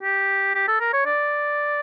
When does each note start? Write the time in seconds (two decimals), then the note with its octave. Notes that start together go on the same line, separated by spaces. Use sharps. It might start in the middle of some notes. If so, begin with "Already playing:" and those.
0.03 G4
0.55 G4
0.68 A4
0.80 A#4
0.93 C#5
1.05 D5